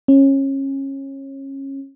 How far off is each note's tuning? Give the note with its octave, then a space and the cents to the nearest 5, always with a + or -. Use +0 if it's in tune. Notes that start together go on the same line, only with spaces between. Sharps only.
C#4 -25